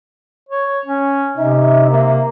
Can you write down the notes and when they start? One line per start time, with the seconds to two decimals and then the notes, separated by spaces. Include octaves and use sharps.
0.49 C#5
0.86 C#4
1.37 C3 D#4 E5
1.91 A#3